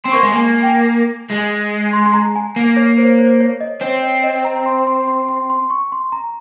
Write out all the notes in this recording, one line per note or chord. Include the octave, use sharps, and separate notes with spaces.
C4 C6
A#3 C#6
G#3 C6
A#3 G#5
G5
G#5
G#3
C6
C6
A#5
G#5
A#3
C#5
C5
C5
C#5
D#5
C4 C#5
D#5
D#5
A#5
C6
C6
C6
C6
C6
C#6
C6
A#5